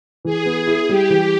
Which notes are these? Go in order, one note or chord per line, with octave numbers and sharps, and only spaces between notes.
E3 G#4
B3
E4
G3 G4
E3